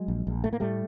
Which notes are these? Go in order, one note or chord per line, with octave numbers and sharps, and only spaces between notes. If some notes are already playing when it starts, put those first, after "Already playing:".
Already playing: F#3 G#3
A#1
A#1
A2 A3
A#3
A2 G3 A3